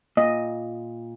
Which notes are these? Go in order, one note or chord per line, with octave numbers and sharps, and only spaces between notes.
A#2 D#5